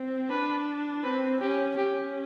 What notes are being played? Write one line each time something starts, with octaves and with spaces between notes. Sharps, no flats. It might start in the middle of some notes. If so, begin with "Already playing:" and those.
Already playing: C4
D4 B4
C4 B4
C#4 G4
C#4 G4